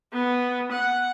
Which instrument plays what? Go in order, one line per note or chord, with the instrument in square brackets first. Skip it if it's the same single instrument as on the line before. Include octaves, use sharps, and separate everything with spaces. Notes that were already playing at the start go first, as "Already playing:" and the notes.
[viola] B3
F#5